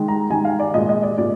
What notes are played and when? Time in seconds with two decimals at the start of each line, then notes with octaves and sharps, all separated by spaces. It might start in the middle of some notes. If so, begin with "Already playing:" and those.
Already playing: D#3 G#3
0.08 A#5
0.30 D#3 G#3 G#5
0.45 F5
0.60 D5
0.74 A#2 G#3 D#5
0.89 D#5
1.03 D5
1.18 A#2 G#3 D5